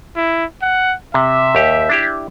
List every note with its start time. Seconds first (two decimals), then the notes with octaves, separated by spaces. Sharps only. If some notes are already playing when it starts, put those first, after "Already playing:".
0.16 E4
0.62 F#5
1.14 C3 E5
1.55 D#2 G4
1.89 D4 E4 G4